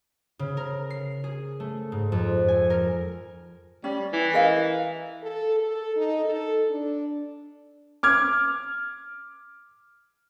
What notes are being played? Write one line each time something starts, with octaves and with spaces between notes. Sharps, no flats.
C#3
A#4
C7
G#4
A3
G#2
F2
G#5
A#4
G3 C#4
E3
A#4 D#5 F5
A4
A4
D#4
A4
D4
D6 F6 G#6